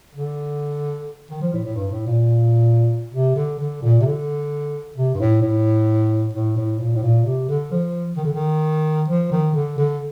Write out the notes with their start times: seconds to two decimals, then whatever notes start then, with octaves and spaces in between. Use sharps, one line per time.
0.15 D3
1.30 D#3
1.42 F3
1.53 A2
1.65 A2
1.76 G2
1.91 A2
2.07 A#2
3.13 C3
3.36 D3
3.59 D3
3.83 A#2
4.01 C3
4.05 D3
4.97 C3
5.14 G2
5.20 A2
5.42 A2
6.34 A2
6.56 A2
6.80 A#2
6.95 A2
7.03 A#2
7.25 C3
7.49 D3
7.71 F3
8.17 D#3
8.25 D3
8.34 D#3
9.08 F3
9.32 D#3
9.55 D3
9.78 D3